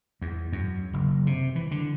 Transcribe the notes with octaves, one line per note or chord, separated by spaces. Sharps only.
E2
F#2
F#1
C3
E3
D3